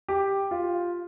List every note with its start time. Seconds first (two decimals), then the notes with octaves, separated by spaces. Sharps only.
0.09 G4
0.51 F4